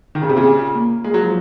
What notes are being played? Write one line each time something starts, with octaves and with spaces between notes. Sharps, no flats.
D#3 F4
C#3
C3
A#2 C#3
C#4
A#3
G#3 F4
F#3
F3